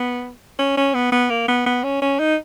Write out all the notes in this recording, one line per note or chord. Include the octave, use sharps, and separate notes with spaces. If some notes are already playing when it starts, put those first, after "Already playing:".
Already playing: B3
C#4
C#4
B3
B3
A#3
B3
B3
C#4
C#4
D#4